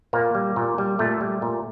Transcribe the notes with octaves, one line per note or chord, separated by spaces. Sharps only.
A#2 A#3
G3
A#2
G3
A#2 A3
G3
A#2